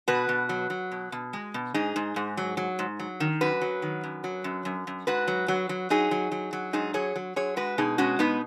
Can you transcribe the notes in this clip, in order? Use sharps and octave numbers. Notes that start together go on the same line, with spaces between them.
B2 F#4 B4
B2
F#3
F#3
B2
B2
G#3
B2
G#2 D#4 G#4
G#2
G#2
F#3
F#3
G#2
F#3
D#3
F#2 F#4 B4
F#3
D#3
F#2
F#3
F#2
F#2
F#2
G#2 F#4 B4
F#3
F#3
F#3
F#3 D#4 G#4
F#3
F#3
F#3
G#2 D#4 G#4
F#3 G#4 C#5
F#3
F#3 G#4 C#5
G#3 F#4 B4
B2 D#4 G#4
G#3 C#4 F#4
B2 B3 D#4